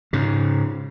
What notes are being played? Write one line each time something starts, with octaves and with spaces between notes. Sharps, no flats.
G#2 C#3